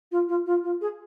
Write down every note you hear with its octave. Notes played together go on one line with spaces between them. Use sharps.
F4
F4
F4
F4
G#4